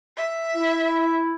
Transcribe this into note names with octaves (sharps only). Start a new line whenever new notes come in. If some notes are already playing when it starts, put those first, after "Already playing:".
E5
E4